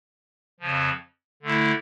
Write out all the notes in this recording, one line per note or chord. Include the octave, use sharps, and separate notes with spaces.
F2 C#3 F3
D3 A3 E4